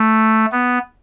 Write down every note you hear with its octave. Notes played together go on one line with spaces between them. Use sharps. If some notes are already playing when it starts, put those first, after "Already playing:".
Already playing: A3
B3